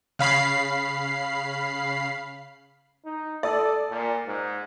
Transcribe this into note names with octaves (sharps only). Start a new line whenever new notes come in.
C#3 F5 B5 C7
D#4
A4 D5 D#6
A#2
G#2